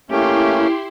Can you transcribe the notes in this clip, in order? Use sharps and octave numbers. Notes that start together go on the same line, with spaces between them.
A3 A#3 C#4 E4 G4 C6